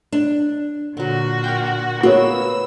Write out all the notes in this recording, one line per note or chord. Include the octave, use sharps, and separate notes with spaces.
D4
A#2 D3 F#3 F#4
A#4 G5
A#3 B3 F#4 C#5 E6